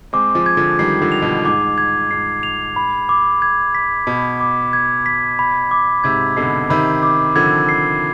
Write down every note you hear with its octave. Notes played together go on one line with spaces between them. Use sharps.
G#3 C4 D6
F3 G#3
G#6
D3 F3
D#3 G3 C7
D3 F3
F7
B2
G#2 D6
G#6
G#2 C7
F7
B5
D6
G#6
B6
B2 B5
D6
G#6
B6
B5
D6
G#2 C3 G#6
B2 D3 C7
C3 D#3 B5
D6
D3 F3 G#6
C7